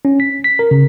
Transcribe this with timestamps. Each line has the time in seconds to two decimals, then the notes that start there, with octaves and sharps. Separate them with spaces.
0.05 C#4
0.20 B6
0.44 B6
0.59 A#4
0.71 C#3